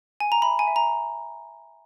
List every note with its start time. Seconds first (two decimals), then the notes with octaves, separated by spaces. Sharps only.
0.20 G#5
0.32 A#5
0.42 E5 B5
0.59 G#5
0.67 E5
0.76 A#5